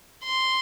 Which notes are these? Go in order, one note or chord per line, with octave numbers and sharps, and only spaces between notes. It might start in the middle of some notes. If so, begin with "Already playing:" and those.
C6